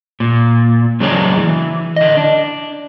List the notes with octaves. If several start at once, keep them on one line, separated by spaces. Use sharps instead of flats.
A#2
C#3 F#3 G#3 A#3 C#4 D4
E3
D3 D#5
D4